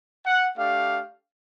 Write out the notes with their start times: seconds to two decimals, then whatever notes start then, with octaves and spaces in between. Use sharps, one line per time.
0.25 F#5
0.56 A3 D4 G4 F5